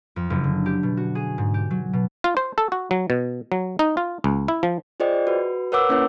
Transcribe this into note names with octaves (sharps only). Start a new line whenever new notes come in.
F2
F#1
D3
G4
B2
F#4
G#4
G#2
G4
F#3
B2
F4
C5
A4
F#4
F#3
B2
F#3
D#4
F4
C#2
E4
F3
F4 G#4 C5 D5 D#5 G5
F#4 B4
A#4 B4 C#5 F#5 D6 E6
A#3 C#4 E4 B4 C#5